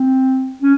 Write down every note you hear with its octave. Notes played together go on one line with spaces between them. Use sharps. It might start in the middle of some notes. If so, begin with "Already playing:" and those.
Already playing: C4
C#4